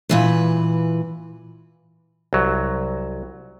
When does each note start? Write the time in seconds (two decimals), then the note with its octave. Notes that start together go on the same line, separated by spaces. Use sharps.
0.09 A#2 E3 B4
2.33 C2 F#3